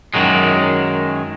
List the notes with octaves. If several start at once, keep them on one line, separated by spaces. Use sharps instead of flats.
F#2 D#3 F#3 G#3